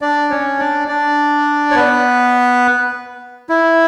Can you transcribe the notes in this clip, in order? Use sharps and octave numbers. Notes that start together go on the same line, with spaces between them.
D4 D5
C#4 C#5
D4 D5
D4 D5
C#5
B3 B4
E4